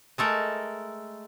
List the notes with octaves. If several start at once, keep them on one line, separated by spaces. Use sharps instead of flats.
G#3 A3 A4 A#4